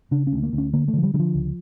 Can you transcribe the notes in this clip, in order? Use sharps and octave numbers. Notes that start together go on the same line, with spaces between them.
C#3 D4
C#4
D2
A#3
D2
C#4
D3 A#3
A3
D3 F3
G3
D3 G3
F3
C#2